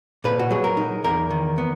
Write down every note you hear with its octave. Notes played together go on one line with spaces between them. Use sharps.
A#2 B4
F#4
F#3 G#4
A#4
D#4
E2 A#4
D#3
B3